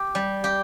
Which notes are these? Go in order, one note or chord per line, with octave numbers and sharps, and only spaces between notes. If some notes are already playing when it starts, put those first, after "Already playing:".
Already playing: G4
G3
G4